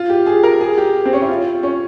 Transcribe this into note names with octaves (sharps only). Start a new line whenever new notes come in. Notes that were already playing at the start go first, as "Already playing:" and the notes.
Already playing: F4
G4
G#4
A#4
G#4
G4
C4
C#4
E4
F4
C#4